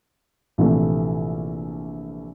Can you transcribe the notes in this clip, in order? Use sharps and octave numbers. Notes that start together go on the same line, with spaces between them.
A#1 C3 E3 A3